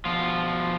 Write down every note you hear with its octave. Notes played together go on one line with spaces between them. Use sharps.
B2 F3 F4